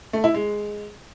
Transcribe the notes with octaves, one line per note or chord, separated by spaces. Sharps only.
A3
E4
G#3